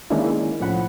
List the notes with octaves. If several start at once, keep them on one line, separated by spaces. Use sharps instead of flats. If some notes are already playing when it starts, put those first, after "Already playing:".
D#3 G#3 A#3 C#4 D4 E4
C2 A2 F3 C#4 F#5 B5